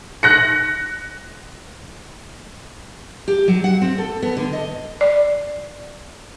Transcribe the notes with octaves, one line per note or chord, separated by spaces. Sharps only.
F#6 A#6 C#7
G4
F#3
F#5
C4
A4
B3
D3
D#5
D5